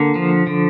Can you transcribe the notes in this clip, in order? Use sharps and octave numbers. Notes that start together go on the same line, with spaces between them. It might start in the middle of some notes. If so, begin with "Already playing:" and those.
Already playing: D3 A#3
F3
D3